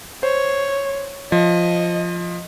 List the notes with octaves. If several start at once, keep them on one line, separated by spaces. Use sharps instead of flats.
C5 C#5
F3 D#5